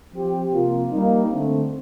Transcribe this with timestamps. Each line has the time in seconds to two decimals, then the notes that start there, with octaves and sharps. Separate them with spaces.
0.13 F3 C4 G4
0.52 C3 F3 A#3 F4
0.90 G3 A#3 D#4
1.30 D3 A3 C4